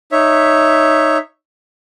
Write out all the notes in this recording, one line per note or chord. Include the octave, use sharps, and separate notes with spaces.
D#4 C#5 E5